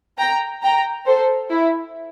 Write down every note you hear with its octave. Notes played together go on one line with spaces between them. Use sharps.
G5 A#5
G5 A#5
A4 C5
E4